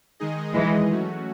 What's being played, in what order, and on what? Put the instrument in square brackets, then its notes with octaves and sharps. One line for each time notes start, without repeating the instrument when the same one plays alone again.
[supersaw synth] D#3 G#3 D#4 G#4 D#5
[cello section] E3 G#3
[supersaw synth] F#3 A3 C#4 F#4